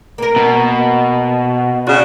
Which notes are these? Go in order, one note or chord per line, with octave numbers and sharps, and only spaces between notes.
A#3 A#4
B2
C#3 D4 F#4